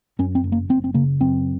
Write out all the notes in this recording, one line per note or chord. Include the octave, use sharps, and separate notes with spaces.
F#2 C#4
C4
F#1
A#3
F#1 C4
C4
C#3 A#3
F#2 C4